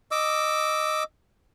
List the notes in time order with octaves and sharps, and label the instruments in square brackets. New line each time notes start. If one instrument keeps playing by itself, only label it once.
[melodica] D#5 D6 E6